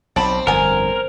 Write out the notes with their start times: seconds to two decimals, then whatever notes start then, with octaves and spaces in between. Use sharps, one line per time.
0.16 B1 C4 D5 A5 B5
0.47 G1 F2 B3 A#4 G#5